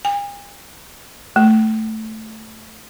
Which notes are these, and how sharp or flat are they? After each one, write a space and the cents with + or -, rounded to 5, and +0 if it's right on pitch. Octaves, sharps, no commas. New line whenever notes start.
G#5 -45
A3 +0